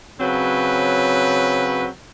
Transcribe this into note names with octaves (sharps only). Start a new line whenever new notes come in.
C#3 F#3 C4 B4